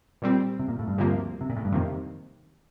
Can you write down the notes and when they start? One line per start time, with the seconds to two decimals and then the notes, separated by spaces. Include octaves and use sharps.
0.22 A#2 G3 C4
0.59 C3
0.68 A#2
0.79 A2
0.88 G2
0.97 D2 C3 F3 A#3
1.41 C3
1.50 A#2
1.57 A2
1.65 G2
1.72 F2 C3 D#3 A#3